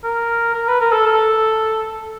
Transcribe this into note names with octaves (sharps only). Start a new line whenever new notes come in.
A#4
A#4
B4
A#4
A4
A4